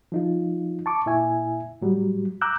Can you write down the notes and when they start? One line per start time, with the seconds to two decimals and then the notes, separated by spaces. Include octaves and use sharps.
0.12 F3 D#4 F4
0.86 A5 C#6 D6
1.06 A#2 E4 E5 G#5
1.82 A2 F#3 G3
2.41 A#5 D6 E6 F#6 G6